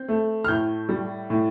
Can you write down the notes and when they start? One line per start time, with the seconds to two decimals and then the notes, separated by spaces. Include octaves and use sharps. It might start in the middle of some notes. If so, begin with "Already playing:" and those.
Already playing: C4 G6
0.08 A3
0.44 F6
0.48 A2 G6
0.89 G3
1.30 A2